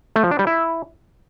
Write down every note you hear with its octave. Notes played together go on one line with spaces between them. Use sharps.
A3
F3
D4
G3
E4